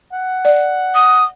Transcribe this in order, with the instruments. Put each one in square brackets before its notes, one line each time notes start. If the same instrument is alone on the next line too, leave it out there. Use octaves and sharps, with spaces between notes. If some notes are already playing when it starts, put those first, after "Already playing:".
[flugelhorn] F#5
[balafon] D5
[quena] D#6